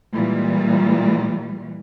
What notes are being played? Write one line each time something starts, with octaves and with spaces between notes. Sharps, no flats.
A#2 E3 G3 G#3